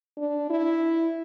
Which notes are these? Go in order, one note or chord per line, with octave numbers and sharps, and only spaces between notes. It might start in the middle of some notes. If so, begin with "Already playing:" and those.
D4
E4